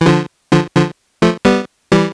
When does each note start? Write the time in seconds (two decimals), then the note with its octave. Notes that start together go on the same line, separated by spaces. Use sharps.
0.01 E3
0.06 D3 F3
0.52 D3 F3
0.76 D3 F3
1.22 F3 A3
1.45 G3 B3
1.92 E3 G3